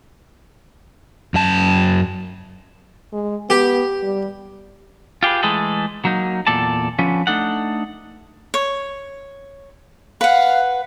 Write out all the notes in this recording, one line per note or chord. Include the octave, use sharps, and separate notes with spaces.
F#2 A5
G#3
B3 G4
G3
F4 G4 G#4 B4
E3 G#3 A3 G#4 A4
F#3 A#3 D#4
E2 A#2 A4 D5 A5
D3 F3 B3 C#4
A3 D4 D#4 A4 F#5
C#5
B4 F5 F#5